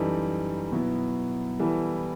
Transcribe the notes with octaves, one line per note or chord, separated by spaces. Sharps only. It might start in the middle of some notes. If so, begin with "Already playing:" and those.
Already playing: F#2 E3 G3 D#4 A4
B2 F#3 B3 E4
E3 G3 B3 E4 A4